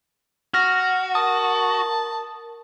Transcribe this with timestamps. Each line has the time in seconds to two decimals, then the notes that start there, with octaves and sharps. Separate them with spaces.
0.54 F#4 F6 A#6
1.15 A#4 A5 D#6